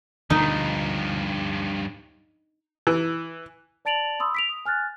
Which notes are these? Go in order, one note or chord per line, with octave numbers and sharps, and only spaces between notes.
D2 G2 B2 D3 F3 D#4
E3
D5 A5 A6 D7 F7 F#7
B5 C6 D#6 E6
B6 D7 F7
D#6
G#5 F6 F#6 A6